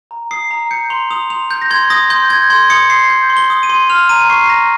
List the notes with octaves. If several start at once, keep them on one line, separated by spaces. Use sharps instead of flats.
A#5
D#6 C7
A#5
G6 C#7
C6 F7
D#6 F7
C6 F7
G6
A#6
C6 G#6
D#6 A#6
C6 G6
G6 G#6
C6 G#6
D#6 C#7
C6 C7
G6
C6
G7
D#6
D#7
C6
F6 F7
A#5 D#7
C#6 C7
A#5 A#6